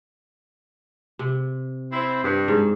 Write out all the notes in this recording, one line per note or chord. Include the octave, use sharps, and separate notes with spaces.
C3
C4 E4
G2
G#2